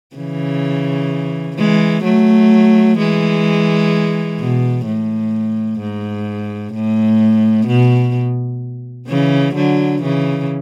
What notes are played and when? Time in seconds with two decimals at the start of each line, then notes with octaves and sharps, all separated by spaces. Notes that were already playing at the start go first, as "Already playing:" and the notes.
0.16 C#3 E3
1.57 E3 G#3
2.04 F#3 A3
2.98 E3 G#3
4.39 B2
4.86 A2
5.80 G#2
6.74 A2
7.68 B2
9.09 C#3 E3
9.55 D3 F#3
10.03 C#3 E3